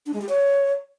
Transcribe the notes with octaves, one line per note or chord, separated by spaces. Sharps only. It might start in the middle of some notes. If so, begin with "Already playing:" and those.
D4
G#3
G4
C#5